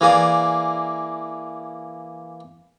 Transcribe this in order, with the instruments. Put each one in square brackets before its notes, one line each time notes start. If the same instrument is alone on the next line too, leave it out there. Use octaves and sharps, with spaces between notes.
[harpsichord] E3 A#3 G#4 D5